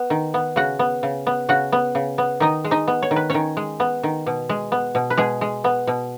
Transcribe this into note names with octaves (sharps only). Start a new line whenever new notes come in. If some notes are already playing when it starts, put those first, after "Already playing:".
Already playing: B3
D#3
B3
C#3 F#4 F#5
B3
C#3
B3
C#3 F#4 F#5
B3
C#3
B3
D#3 D#4 D#5
G#3
D#4 D#5
B3
C#5
D#3
B4
D#3 C#4 C#5
G#3
B3
D#3
B2
G#3
B3
B2
B4
B2 G#3 G#4
G#3
B3
B2